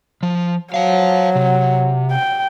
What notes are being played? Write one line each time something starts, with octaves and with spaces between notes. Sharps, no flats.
F3
F#3 C5 F5
C3
G5